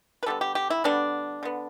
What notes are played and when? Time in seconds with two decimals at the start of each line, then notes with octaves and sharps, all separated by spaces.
0.23 B4
0.26 D3 G3 B3 A4
0.41 G4
0.55 G4
0.70 E4
0.84 D3 G3 B3 D4
1.43 D3 B3